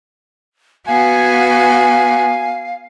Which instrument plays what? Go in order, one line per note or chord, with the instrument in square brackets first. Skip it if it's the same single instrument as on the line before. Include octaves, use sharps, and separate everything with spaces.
[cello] B3 F#4 [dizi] F5 [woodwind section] G#5